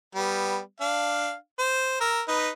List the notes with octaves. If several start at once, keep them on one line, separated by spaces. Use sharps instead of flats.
G3 B3
D4 F5
C5
A#4 E6
D#4 B4